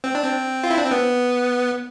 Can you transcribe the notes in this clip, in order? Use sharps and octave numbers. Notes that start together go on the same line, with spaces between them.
C4
D4
C4
F4
E4
D4
C4
B3